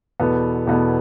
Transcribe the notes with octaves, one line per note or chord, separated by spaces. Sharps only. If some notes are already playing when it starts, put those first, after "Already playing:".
E2 B2 B3 A4
E2 B2 B3 A4